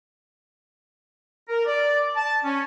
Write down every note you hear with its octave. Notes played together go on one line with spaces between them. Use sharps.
A#4
D5
A5
C#4